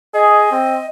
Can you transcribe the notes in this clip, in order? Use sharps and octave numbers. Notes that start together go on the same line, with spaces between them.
G#4 D#5
C4